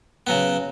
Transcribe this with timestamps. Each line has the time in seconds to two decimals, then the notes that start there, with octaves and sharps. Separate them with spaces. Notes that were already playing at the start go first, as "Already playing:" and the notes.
0.27 C#3 F#3 B3